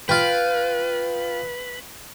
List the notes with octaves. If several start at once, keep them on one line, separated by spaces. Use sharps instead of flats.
F4 B4 G5